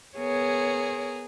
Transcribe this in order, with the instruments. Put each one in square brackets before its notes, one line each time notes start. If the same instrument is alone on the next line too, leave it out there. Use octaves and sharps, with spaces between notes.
[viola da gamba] B3 G#4 A#4 [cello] C#5